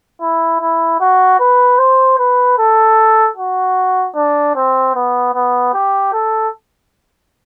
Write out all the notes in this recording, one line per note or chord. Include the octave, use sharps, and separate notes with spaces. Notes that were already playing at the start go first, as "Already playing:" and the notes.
E4
E4
F#4
B4
C5
B4
A4
F#4
D4
C4
B3
B3
G4
A4